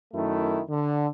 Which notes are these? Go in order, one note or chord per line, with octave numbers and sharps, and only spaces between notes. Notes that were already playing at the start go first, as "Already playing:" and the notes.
F#2 D#3 A3 E4
D3